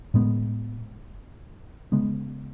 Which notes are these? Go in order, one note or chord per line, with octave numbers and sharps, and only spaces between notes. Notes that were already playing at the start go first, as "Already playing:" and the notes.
A2 G#3 B3
C#3 G#3 B3